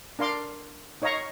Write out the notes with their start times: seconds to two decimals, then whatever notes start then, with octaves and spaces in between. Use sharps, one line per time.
0.19 D4 A#4 F5 C6 D6
1.02 D#4 C#5 D#5 F5 A#5 C#6